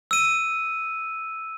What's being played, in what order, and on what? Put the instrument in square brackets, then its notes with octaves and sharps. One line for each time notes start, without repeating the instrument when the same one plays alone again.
[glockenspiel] E6 D#7